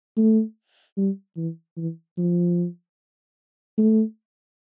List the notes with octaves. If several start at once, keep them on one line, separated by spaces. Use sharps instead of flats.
A3
G3
E3
E3
F3
A3